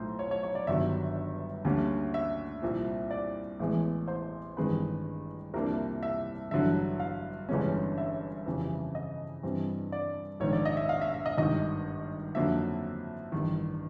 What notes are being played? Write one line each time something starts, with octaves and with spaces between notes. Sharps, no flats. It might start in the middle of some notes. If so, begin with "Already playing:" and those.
Already playing: B1 A2 F3 A3 C5
C#5
C#5
C#5
D5
G1 G2 D#3 F#3 B3 E5
D2 D3 G3 A#3 C#4
E5
C2 A#2 F3
D5
A1 A2 E3 G#3 B3
C5
A1 G2 D#3 G#3 C4 B4
C2 C3 F3 A#3 D4 A#4
E5
A1 G2 D3 F#3 E5
F5
G1 G2 E3 G#3 C#4
E5
F2 C#3 E3 G3
D#5
G2 E3 G3 C4
D5
A#1 G#2 D#3 C#5
D5
D#5
E5
F5
E5
E5
D#5
G#1 G2 D#3 D#5
F2 D3 F#3 A#3 E5
A1 G2 D#3